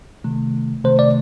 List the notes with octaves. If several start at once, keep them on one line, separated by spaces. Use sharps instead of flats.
C3 D#3 A3
C3 D#3 A3 C5
D5